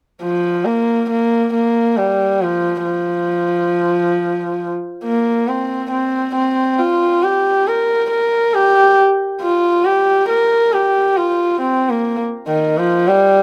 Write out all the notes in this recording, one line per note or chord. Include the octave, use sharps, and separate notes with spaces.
F3
A#3
A#3
A#3
G3
F3
F3
A#3
C4
C4
C4
F4
G4
A#4
A#4
G4
F4
G4
A#4
G4
F4
C4
A#3
D#3
F3
G3